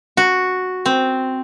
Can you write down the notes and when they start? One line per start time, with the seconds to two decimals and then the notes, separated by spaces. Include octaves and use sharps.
0.17 F#4
0.86 C4